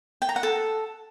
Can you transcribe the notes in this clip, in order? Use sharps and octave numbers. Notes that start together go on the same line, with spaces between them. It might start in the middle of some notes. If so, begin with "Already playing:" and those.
G5
A#5
F#5
A4